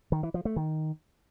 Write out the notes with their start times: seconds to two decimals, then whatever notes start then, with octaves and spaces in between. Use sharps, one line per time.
0.12 D#3
0.23 E3
0.34 F3
0.45 A3
0.56 D#3